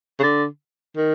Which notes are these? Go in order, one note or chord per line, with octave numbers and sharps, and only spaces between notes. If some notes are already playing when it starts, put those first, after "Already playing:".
C#3
D3
D#3